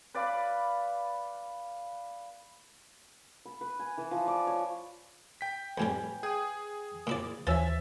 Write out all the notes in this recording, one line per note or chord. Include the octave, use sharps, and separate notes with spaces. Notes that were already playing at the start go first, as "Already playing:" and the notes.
B4 D5 F5 B5
B5
B4
G#5
E3
F3
D5
C#5
G5 B6
F2 A2 G3 B4 G#5
G#4 G5 G#5 D#6
A#2 E4 D5
D#2 E3 F3 C#4 E5 E6 A6